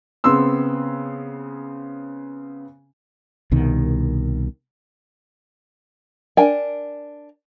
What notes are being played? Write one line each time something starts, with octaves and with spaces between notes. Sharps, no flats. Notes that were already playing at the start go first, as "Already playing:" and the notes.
C#3 B3 C4 C6 E6
C2 B2 D#3
D4 A#4 G5 G#5